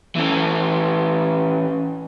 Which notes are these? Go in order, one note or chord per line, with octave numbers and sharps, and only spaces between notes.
E3 C#4